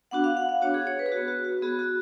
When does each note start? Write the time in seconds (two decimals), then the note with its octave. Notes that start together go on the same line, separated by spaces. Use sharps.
0.11 B3 D4 F#4 F#5
0.24 F5
0.37 F#5
0.49 F5
0.62 B3 D4 F#4 C#5
0.74 G#4
0.87 C#5
0.99 B4
1.06 G#4
1.12 B3 F#4
1.28 F#4
1.45 F#4
1.62 B3 F#4 G#4
1.79 F#4